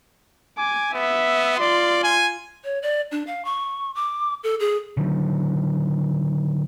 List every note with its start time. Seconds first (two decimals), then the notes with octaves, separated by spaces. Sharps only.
0.57 G#5 D6
0.94 B3 E5
1.60 F4 D5 C6
2.03 G#5
2.64 C#5
2.82 D5
3.12 D4
3.27 F5
3.45 C#6
3.95 D6
4.44 A4
4.60 G#4
4.97 D3 D#3 F#3